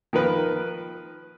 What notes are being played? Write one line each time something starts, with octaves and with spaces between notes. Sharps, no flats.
D#3 F3 A#4 B4